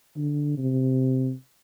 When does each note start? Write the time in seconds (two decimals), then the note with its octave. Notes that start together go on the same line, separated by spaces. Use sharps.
0.16 D3
0.58 C3